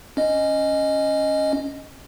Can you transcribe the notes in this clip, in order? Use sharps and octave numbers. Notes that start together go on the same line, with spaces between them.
C#4 D#5